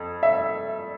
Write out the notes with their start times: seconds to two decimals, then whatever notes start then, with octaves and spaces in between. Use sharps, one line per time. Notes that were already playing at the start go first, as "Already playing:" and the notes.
Already playing: F2
0.23 E5